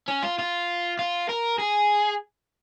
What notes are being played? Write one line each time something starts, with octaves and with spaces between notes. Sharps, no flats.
C#4
F4
F4
F4
A#4
G#4